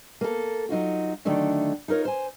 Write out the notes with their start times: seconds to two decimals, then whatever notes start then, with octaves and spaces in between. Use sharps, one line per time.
0.21 A#3 A4
0.69 F#3 D#4 F4 F#4
1.25 D3 D#3 F#3 A3 D4
1.88 D#4 F4 A#4 C#5
2.05 C5 G#5